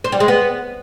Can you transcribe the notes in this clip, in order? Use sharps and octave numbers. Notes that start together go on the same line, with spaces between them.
C5
G3
G#3
B3